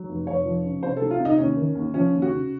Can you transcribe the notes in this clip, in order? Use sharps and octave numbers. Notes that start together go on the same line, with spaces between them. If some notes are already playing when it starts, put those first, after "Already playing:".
Already playing: F#3
F1
F1 C#5
F3
C#3
C3 C5
F#3 A4
F4
C3
D#4
D#2 C#4
D#3
D#2
F3 C#4
D#2
F#4
C#3